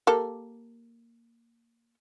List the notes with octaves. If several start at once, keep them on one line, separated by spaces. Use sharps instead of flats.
A#3 G4 A4